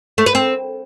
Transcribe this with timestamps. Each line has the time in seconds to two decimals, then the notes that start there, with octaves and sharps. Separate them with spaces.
0.18 A3
0.26 B4
0.35 C4